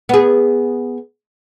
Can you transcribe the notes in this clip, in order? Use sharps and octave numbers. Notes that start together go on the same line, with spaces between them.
B3 G#4